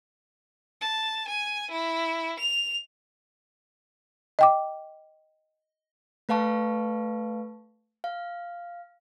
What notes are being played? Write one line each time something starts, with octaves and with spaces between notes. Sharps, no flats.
A5
G#5
E4
F7
D#5 G5 D6
A3 B4 F5 A5 C#6
F5